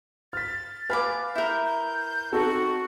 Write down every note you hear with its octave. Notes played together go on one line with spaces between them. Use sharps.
F6 A6 B6
B4 F5 G#5 B5 D6 F6
E4 A#4 G6
G6
C4 D#4 F#4 A4